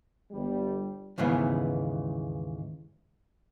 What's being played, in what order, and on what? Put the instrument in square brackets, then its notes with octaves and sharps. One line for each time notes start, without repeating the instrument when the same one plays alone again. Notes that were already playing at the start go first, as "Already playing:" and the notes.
[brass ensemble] G1 G3
[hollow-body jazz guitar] D#2 G#2 C#3 E3 B3